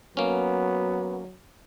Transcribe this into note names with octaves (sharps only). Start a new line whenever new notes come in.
F#3 A#3 B3 C#4